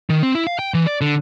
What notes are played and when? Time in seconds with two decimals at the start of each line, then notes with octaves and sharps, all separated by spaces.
0.10 D#3
0.23 C4
0.35 E4
0.47 F5
0.59 G5
0.74 E3
0.86 D5
1.01 D3